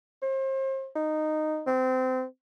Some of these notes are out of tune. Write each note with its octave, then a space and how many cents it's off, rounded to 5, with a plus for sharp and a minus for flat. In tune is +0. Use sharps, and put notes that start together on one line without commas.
C5 +35
D#4 -10
C4 -25